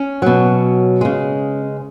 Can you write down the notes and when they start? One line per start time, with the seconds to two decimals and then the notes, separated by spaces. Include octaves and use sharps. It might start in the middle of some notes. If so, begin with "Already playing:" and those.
Already playing: C#4
0.22 B2 F#3
1.01 C#3 G#3